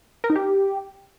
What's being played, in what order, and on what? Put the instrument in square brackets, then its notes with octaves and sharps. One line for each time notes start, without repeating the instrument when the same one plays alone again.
[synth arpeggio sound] A#4
D#4
G4